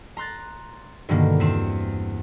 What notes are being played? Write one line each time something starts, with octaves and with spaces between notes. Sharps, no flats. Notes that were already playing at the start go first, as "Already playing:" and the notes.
A#5 C6 F#6 A6
G2 B2 D3 D#3 A#3
E2 C4 E7